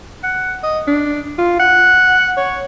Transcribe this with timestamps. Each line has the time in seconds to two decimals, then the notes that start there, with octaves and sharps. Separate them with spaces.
0.23 F#5
0.63 D#5
0.87 D4
1.38 F4
1.59 F#5
2.37 C#5